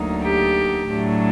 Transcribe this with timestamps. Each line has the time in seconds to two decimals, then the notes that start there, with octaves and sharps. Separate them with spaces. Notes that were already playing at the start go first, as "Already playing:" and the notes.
Already playing: D2 D3 F#3 A#3 D#4
0.24 G4
0.91 A2 F#3 A3 D4